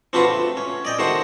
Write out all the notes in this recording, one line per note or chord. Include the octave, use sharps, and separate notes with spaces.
C4 D4 F4 F#4 B4
A3
C#4
D5 D#5 G5
D#3 A3 F#4 C5